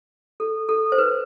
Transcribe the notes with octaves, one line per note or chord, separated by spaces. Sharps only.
A4
A4
C5
B4